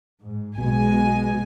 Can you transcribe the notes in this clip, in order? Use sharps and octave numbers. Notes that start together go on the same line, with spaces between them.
G#2
B1 B2 G#3 G#5